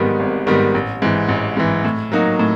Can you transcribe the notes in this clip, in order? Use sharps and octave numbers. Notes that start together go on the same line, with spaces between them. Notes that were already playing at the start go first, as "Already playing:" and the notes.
Already playing: G#2 D#3 G3 B3
G#1
G#2 D#3 G3 B3
A1
G#2 E3
A1
G#2 E3
A2
F#3 A#3 D#4 F#4
A2